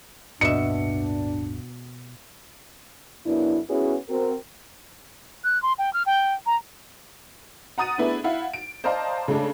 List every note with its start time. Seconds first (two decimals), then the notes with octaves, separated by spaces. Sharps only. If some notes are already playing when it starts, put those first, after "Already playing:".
0.41 D1 G2 B2 A#3 D4 E5 C#7
3.26 F#2 C#3 B3 D4 E4
3.69 B3 C#4 E4 F#4 G#4 B4
4.10 C4 F#4 A#4
5.44 F#6
5.63 C6
5.79 G5
5.94 F6
6.06 G5
6.46 A#5
7.78 F#5 A#5 D#6 A6 D#7
7.98 A3 B3 D4 E4 G#4 B4
8.24 E4 F5 F#5
8.53 D7
8.84 C5 D5 D#5 F5 A5 A#5
9.28 C#3 G#3 A3 D4 A4